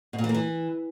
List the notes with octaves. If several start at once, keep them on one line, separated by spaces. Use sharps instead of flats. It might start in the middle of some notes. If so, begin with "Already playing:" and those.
B2
A#2
E3
A#3
E3